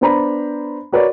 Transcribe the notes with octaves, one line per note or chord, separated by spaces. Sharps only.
B3 D4 C5 A#5 B5
F#4 A#4 B4 C#5 D5